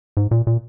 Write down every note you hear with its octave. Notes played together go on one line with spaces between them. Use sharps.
G#2
A#2
A#2